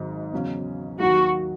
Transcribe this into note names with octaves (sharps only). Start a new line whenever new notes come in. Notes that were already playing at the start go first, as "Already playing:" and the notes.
Already playing: G#1 G#2 F#3
E2 C#3 F#3 C#4
D#2 D#3 F#3 F#4